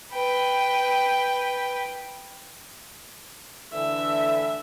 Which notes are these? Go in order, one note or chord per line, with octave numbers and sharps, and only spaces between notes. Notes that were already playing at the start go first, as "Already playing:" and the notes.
B4 G5
D3 E3 A3 E5